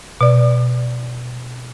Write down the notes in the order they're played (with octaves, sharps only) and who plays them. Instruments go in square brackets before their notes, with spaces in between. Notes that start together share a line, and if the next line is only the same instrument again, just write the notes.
[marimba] B2 D5